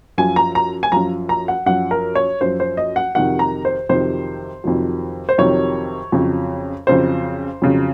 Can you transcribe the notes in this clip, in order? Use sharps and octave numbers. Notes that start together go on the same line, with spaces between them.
F#2 F3 G#5
A#5
A#5
G#5
F#2 F3 A#5
A#5
F#5
F#2 F3 F#5
A#4
C#5
F#2 F3 C5
C5
D#5
F#5
F2 C3 D#3 F#3 F#5
A#5
C5
F2 C3 D#3 F#3 C5
F2 C3 D#3 F#3
C5
F2 C3 D#3 F#3 C#5
F2 C#3 F#3
F2 C#3 F#3 C5
F2 C#3 F#3